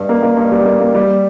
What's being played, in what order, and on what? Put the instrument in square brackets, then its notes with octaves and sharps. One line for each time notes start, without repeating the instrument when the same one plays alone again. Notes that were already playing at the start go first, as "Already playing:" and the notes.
Already playing: [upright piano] G2
A#3
A#3
G2
G3
A#3
A#3
G3